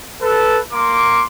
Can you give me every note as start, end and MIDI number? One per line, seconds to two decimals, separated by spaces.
0.21 0.58 69
0.21 0.58 71
0.73 1.21 58
0.73 1.21 84
0.73 1.21 86